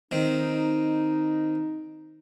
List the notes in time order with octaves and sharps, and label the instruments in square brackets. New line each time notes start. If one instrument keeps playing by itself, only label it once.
[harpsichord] D#3 C4 [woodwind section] D#4